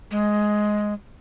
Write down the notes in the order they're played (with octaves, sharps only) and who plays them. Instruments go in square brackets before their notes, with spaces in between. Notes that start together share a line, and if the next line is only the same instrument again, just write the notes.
[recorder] G#3